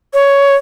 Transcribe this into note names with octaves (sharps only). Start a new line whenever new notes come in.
C#5